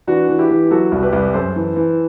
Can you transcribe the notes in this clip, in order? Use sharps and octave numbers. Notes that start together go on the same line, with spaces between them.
E3 D4 F#4
E3
E4 G4
E3
F#3 F#4 A4
C2
G4 B4
C2
F#2 A4 C5
E3
E3